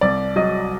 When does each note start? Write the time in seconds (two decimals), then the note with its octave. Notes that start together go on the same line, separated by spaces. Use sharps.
0.01 C2 D5
0.36 F#3 D#5